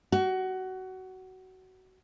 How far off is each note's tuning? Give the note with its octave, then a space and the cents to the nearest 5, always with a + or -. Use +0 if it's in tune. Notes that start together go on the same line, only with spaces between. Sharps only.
F#4 +20